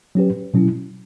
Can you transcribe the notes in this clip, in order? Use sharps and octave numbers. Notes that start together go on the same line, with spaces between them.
F#3 C#4 G4 B4
B2 F#3 C#4 E4